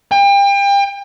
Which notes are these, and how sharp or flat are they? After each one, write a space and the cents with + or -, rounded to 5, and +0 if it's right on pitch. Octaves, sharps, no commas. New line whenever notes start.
G5 +35